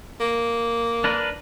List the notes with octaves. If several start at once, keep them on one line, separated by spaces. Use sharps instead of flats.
A#3
D4 A#4 B4